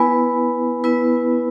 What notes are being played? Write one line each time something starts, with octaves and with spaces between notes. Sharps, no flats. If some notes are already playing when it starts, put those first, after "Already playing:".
Already playing: B3 E4 B4 G#5 B5
B3 E4 B4